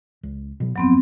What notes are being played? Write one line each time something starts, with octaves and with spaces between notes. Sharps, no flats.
C#2
B2 F#3
G1 F2 F#3 B3 C4